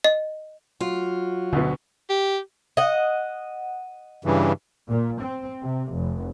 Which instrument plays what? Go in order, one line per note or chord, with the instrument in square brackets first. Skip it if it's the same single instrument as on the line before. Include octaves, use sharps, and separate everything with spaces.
[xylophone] D#5
[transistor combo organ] F#3 F#4 [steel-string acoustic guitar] F4
[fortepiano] D2 B2 [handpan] D3
[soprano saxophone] G4
[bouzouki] D#5 F#5
[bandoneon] G2 C#3 E3
[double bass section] A#2
C4
C3
F1